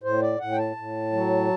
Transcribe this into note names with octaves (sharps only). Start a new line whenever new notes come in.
A2 C5
D5
A2 F#5
G5
A5
A2
F#3